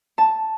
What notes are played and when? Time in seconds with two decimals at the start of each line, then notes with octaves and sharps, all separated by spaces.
0.18 A5